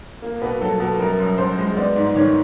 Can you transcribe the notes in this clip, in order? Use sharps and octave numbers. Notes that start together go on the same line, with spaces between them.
A#3
B2 B4
F#3 A4
B2 A4
F#2 A#4
F#2
F#2 C5
G#3
B3 D5
G#2
D#3 C#5